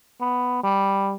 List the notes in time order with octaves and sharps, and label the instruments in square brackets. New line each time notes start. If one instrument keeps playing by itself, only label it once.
[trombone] B3
G3